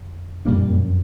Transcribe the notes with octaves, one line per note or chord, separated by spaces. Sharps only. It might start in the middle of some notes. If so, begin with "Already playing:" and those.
Already playing: F2
F#2 A#2 G3 A#3 D4
F2
F#2